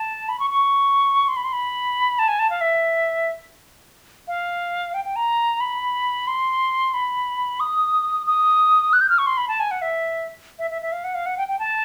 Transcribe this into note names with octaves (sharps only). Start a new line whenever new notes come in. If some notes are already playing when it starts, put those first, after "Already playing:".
Already playing: A5
B5
C#6
C#6
C6
B5
C6
B5
A5
G#5
A5
F5
E5
F5
G5
G5
A#5
B5
C6
B5
D#6
D#6
F#6
G6
F6
C#6
C6
B5
A5
G#5
F#5
E5
E5
E5
E5
F5
F#5
F5
F#5
G5
G5
A5